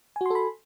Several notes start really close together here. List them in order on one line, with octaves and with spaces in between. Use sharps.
G#5 F#4 C6 A4 B5